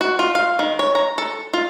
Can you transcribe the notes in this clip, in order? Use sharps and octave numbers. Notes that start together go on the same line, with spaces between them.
F#4
F4
F5
D#3
C#5
A#5
A4
F4